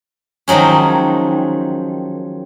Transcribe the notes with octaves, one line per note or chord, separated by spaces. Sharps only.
D#3 F3 F#3 G#3 C#4